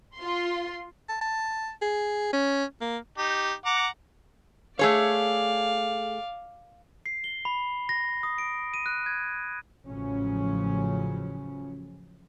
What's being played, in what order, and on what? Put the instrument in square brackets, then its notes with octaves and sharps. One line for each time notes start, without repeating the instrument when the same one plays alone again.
[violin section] F4 C6
[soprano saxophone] A5
A5
G#4
C#4
A#3
[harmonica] D#4 G4
F#5 A#5 D6
[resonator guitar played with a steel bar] A3 G#4 C#5 [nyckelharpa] D5 F5
[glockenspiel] C7
G7
B5
A#6
D#6
D7
D#7
F#6
G#6
[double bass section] A1 A2 C#3 F3 F#3 C#4